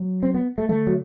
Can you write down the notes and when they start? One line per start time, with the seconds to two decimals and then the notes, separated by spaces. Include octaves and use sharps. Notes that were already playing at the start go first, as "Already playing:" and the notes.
Already playing: F#3
0.23 C4
0.34 B3
0.58 A3
0.69 D3 A3
0.87 F#3